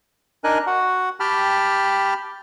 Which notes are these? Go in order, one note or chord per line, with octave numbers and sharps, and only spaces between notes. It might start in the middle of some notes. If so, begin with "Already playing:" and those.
D4 D#4 A#4 D#5 G#5 F#6
F#4 F#5
G4 G5 A5 B5 F6